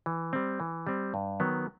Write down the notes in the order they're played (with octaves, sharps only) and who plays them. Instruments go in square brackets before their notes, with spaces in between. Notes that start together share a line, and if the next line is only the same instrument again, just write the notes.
[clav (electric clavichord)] E3
G3 C4
E3
G3 C4
G2
D#3 F#3 B3